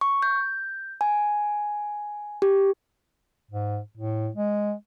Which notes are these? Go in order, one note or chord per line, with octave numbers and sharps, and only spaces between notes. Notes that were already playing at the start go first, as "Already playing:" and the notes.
C#6
G6
G#5
G4
G#2
A2
G#3